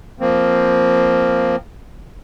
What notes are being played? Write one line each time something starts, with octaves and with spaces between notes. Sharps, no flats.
F3 A#3 C4